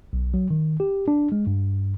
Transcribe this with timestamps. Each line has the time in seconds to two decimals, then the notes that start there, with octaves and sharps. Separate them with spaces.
0.13 B1
0.34 F#3
0.51 D#3
0.80 G4
1.08 D4
1.32 G#3
1.47 G2